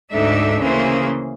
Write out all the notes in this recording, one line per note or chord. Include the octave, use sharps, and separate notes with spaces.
D2 G#2 D4 D#4 A4 E5
C#3 E3 A#3 G#4 C5